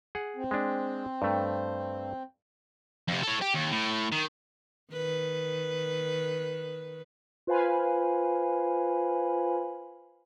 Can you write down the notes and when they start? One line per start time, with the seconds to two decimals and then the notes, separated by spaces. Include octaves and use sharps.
0.15 G#4 F#5
0.36 C4
0.51 G#3 D4
1.22 G2 A3
3.08 F2 C3
3.23 A4 C#5
3.42 G4
3.55 D#2
3.72 A2
4.12 D#3
4.93 D#3 B4
7.47 F4 B4 C5 F5 G#5 B5